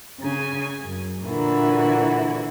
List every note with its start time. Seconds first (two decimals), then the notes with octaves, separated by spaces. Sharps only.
0.20 C#3 G#5
0.81 F#2
1.25 A#2 D3 E3 E4 F#4